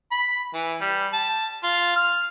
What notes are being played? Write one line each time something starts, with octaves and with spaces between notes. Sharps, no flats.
B5
E3
G3
A5
F4
F6